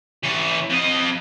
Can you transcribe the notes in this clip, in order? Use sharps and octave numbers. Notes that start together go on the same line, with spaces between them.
E3 C#5
F2 D#5